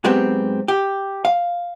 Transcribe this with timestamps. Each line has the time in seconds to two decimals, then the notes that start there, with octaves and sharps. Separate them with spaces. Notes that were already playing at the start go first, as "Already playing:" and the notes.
0.04 G#2 F#3 G#3 B3 C4 G4
0.68 G4
1.25 F5